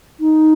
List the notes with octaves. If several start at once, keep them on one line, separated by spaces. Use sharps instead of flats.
D#4